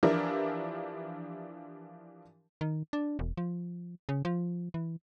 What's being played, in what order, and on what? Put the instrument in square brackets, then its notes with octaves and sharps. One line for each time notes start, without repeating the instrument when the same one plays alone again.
[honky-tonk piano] E3 F3 D4 E4 G4 A#4
[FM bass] D#3
D4
E1
F3
C#3
F3
E3